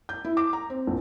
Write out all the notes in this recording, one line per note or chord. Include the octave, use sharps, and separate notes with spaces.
G6
E4
D6
A#5
C4
A#1